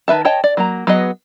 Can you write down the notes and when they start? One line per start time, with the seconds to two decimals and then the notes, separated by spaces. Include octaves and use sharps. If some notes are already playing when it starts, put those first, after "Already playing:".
0.08 D#3 B4 E5 A5
0.25 C#5 D#5 G5 A5
0.44 D5
0.57 F#3 A#3 A#5
0.87 F#3 B3 G#4 B4 D#5